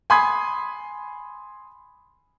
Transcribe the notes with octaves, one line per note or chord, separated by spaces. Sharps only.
G#5 B5 C6 D#6 G#6